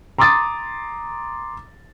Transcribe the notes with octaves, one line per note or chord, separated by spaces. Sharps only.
A#5 C6 D6 D#6 A6